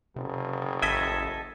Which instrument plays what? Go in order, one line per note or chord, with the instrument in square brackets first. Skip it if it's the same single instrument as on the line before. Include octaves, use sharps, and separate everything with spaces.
[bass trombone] F#1 [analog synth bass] C3
[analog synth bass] A1 [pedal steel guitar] A4 D#5 E5 [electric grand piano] G#6 B6